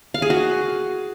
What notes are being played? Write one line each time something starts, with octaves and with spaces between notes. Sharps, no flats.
F5
G#4
F#4